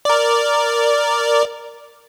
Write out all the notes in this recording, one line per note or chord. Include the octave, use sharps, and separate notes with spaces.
A#4 D5